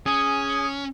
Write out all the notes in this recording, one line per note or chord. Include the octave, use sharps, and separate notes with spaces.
C#4 G#4